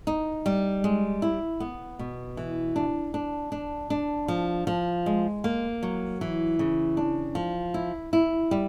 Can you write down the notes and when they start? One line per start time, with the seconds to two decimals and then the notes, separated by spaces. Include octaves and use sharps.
0.07 D#4
0.46 G3
0.84 G#3
1.22 E4
1.60 B3
1.99 B2
2.37 E3
2.76 D4
3.14 D4
3.52 D4
3.90 D4
4.28 F3
4.67 F3
5.06 G#3
5.44 A#3
5.83 F#3
6.21 E3
6.59 C#3
6.97 D4
7.35 F3
7.74 E4
8.13 E4
8.51 G3